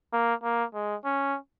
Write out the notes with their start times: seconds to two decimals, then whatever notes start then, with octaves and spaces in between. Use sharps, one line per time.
0.13 A#3
0.43 A#3
0.74 G#3
1.05 C#4